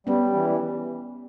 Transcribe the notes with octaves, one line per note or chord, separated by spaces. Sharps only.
G3 B3 C#4
E3